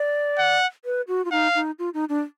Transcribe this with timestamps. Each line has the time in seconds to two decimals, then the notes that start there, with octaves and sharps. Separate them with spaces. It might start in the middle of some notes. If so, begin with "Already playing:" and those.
Already playing: D5
0.39 F#5
0.85 B4
1.08 F#4
1.25 F4
1.32 D#4 F5
1.55 D#4
1.79 F4
1.94 D#4
2.09 D4